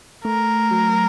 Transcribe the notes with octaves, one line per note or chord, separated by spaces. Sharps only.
A3 A#4
F#3